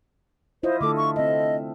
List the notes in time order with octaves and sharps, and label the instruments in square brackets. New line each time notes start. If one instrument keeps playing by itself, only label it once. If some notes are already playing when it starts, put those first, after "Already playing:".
[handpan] E4 F4 D#5 [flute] C5
[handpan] D3 A3 A4 [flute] D6
[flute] C#6
[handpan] C4 E5 [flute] D#5